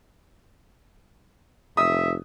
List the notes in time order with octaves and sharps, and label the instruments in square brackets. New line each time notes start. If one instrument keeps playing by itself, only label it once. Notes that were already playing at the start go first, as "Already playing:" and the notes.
[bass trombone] F1 [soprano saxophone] E5 [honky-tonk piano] D#6